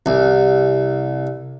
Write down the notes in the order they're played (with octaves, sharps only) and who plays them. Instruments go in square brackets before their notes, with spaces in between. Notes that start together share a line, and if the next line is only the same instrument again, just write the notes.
[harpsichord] C2